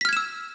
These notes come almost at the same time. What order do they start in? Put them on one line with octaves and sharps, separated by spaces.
B6 F6 G#6 E7 E6